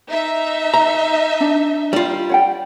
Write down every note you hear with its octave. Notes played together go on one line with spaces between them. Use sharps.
D#4 E5
A#5
D4
G3 F4
C#5 F#5 G5